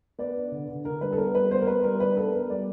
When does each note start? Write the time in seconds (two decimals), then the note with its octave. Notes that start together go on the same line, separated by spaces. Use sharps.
0.19 B3 D5
0.35 D4
0.52 D3
0.68 D3
0.84 D3 A#4
1.01 G3 B4
1.13 A4
1.18 B3 A#4
1.35 G3 B4
1.51 B3 C5
1.61 A#4
1.67 B3 B4
1.84 G3 A#4
2.00 D4 B4
2.17 B3 A4
2.34 B3 A#4
2.50 G3 D5